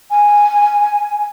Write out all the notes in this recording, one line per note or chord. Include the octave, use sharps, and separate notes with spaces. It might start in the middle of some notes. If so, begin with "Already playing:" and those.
G#5